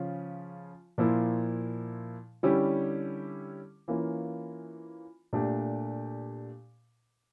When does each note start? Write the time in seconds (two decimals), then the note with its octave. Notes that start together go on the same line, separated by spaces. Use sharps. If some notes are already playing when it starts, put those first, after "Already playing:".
Already playing: C#3 F3 C#4 F4
0.98 A#2 F3 A#3 E4
2.43 D3 G3 C#4 E4 G4
3.88 E3 A#3 C#4 F4
5.33 A#2 A3 D4 G4